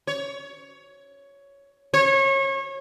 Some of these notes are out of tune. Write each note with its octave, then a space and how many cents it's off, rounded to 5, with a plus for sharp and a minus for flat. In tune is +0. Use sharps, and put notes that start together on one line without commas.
C#5 +10
C#5 -30